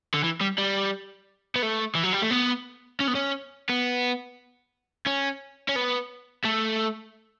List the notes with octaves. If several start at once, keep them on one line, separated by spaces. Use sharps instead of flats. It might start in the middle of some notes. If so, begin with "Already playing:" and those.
D3
E3
G3
G3
B3
A3
E3
F#3
G3
A3
B3
C#4
B3
C#4
B3
C#4
C#4
B3
A3